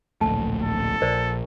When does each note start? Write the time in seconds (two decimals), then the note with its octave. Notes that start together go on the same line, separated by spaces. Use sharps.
0.21 D1 A#1 A3 A5
0.62 A4
1.02 A#1 A#4 C5 D5